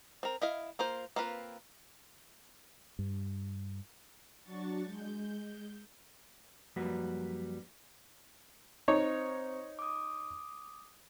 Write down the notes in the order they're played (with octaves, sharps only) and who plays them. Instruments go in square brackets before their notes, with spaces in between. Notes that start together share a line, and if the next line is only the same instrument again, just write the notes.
[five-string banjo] C4 A#4
E4 D#5 F5
A#3 F4 C5
A#3 C4 F4 B4
[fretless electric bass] G2
[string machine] F#3 D4 F#4 C#6 A6
G#3 G6
[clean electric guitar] F#2 F3 G3 A#3 F#4 B4
[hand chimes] C4 C5 C#7 [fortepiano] D#4 C#5
[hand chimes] D6 D#6